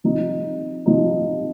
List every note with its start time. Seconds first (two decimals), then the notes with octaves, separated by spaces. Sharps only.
0.04 C3 F3 D#4
0.86 C3 F3 D#4